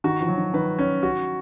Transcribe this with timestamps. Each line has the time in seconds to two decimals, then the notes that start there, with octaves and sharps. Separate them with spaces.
0.04 D#3 F#4
0.21 F3
0.28 F#3
0.37 D#3
0.53 D#3 B4
0.79 C#4
1.03 F#4